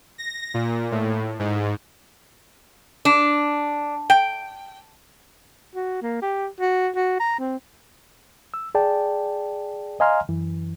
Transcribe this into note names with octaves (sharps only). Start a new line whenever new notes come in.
A#6
A#2
A2
G#2
D4
G5
F#4
A#3
G4
F#4
F#4
A#5
C4
E6
G#4 D5 G5 A5
D#5 F5 G#5 A#5 C6 F6
F#2 E3